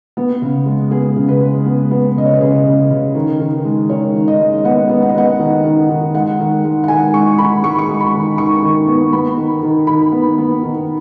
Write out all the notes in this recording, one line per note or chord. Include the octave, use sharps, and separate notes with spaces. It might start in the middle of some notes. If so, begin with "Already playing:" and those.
B3
C#3
G#3
B3 G#4
C#3
B4
G#3
B3
B3
C#3 D#5
C#5
B4
C#3 G#4
C#3
C#3
D#3
D#3
G#3
D#3 C#5
D#3
D#5
G#3
B3 F#5
B3
F#5
D#5
B3 F#5
D#3
D#3
D#3
G#3 F#5
D#3
G#3
F#5
D#3 G#5
G#3 C#6
D#3 B5
G#3 C#6
C#6
G#3
B5
D#3
D#3 C#6
D#3
B3
B3 B5
D#3
D#3
D#3 B5
B3
B3
D#3